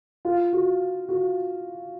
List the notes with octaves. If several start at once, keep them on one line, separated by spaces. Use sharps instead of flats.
F4
F#4
F#4